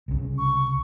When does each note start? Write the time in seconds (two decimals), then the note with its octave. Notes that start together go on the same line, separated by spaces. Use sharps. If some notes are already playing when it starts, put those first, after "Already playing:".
0.08 C2 C#3
0.38 C#6